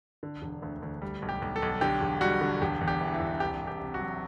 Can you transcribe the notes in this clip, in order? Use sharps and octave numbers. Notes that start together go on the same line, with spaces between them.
D3
E1
D2
D2
G3
B1
G4
B1
A4
B1
D3 G4
E1
G3 F#4
D3
E1 G4
E2
G4
E3
E4
E1
C2 G4
C2
G4
C3
F#4
F#3